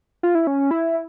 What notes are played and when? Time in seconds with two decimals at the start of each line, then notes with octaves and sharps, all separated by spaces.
0.23 F4
0.35 E4
0.47 C#4
0.71 E4